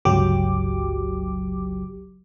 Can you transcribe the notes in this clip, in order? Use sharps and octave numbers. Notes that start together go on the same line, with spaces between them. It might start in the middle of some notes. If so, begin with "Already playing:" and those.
G1 C#2 F#3 G4 D6